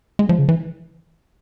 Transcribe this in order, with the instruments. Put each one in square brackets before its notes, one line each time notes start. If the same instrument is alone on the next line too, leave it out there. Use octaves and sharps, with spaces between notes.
[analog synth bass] G#3
F3
C#3
E3